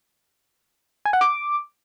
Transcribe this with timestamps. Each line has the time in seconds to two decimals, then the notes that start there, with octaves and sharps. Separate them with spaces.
1.05 G#5
1.13 F#5
1.21 D6